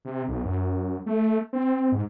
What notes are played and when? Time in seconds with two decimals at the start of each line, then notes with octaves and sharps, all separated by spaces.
0.05 C3
0.28 B1
0.45 F#2
1.06 A3
1.53 C4
1.92 G#2